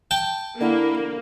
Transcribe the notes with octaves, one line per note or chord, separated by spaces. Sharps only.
G5 A5
D3 A#3 E4